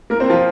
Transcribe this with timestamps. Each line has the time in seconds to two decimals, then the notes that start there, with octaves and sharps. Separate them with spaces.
0.10 A#3 A#4
0.20 C4 C5
0.30 F3 F4